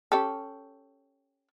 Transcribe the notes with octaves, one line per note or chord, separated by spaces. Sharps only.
C#4 G4 A4